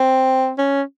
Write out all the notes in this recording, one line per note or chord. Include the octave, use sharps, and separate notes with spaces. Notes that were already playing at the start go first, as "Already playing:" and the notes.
Already playing: C4
C#4